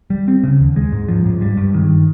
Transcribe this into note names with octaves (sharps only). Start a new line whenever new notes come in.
G3
C4
C#3
D#2
G#3
G#2
F3
G#2
G3
G2
D#3